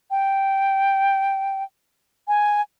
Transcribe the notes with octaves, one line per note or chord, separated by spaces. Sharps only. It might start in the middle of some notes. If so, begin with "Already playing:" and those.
G5
G#5